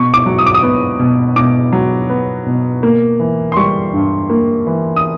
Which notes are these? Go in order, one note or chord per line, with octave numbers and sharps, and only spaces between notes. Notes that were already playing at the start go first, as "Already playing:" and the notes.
Already playing: B2 C#6
D6
F#3
D#6
D6
D#6
B3
B2
B2 D6
F#3
B3
B2
A#3
E3
C6
G3 C#6
G2
A#3
E3
D#6